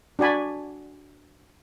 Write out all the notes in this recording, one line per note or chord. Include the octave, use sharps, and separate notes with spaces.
D4 F#4 D5 G#5 B5